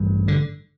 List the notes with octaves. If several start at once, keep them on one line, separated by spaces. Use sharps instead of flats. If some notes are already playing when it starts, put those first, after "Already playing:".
Already playing: A1 G2
D3